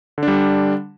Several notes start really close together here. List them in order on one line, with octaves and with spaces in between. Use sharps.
D3 D4 G3